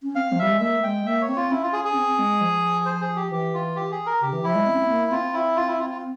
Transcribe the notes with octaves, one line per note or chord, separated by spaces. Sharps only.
C#4
C4 F5
F3
G3 E5
G#3
A#3 E5
G#3 G5
A#3 E5
C#5
C4
F4
C#4 E4
F4
G#4
G#4
C4
G#3
F3
C5
G#4
G4
E3 G4
F4
G4
G#4
A#4
C#3 G4
E3
F3 E4
G#3
C4
C#4
C4
A#3
C4 F4
E4
F4
E4
F4
F4